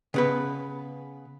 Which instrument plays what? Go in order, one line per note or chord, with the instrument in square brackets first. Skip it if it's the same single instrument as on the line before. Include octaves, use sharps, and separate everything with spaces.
[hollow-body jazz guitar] C#3 B3 B4